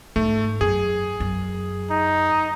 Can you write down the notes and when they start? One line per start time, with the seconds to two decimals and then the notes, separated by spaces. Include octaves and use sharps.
0.16 G#2 A3
0.61 F#2 G#4
1.20 F#2
1.90 D#4